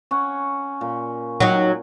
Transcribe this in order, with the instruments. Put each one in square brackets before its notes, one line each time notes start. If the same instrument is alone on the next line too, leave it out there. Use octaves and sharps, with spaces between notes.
[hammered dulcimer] C#4 C#5 F#5
A#2
[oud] F#3 D#4